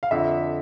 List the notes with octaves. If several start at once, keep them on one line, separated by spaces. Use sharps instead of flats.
F5
F2 D3 F3 E5